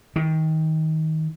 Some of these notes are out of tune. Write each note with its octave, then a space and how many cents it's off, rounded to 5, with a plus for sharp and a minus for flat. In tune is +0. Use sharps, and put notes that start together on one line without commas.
D#3 +25